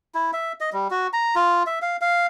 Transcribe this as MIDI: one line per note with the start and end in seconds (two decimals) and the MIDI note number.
0.15 0.31 64
0.33 0.52 76
0.61 0.70 75
0.73 0.88 55
0.91 1.07 66
1.13 1.35 82
1.35 1.63 65
1.67 1.79 76
1.82 1.97 77
2.01 2.27 77